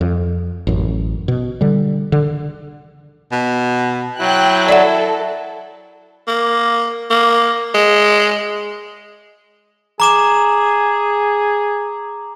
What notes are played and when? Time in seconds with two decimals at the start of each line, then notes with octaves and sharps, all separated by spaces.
0.01 F2
0.67 A1 F#2
1.28 B2
1.61 D3 G3
2.12 D3
3.32 B2
4.19 F#3 E4 G5 F#6
4.69 A4 D5 E5 F#5
6.28 A#3
7.11 A#3
7.75 G#3
10.00 G#4 A#5 D6 E7